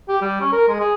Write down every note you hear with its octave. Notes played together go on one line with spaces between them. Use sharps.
G4
G3
C#4
A#4
G#3
G#4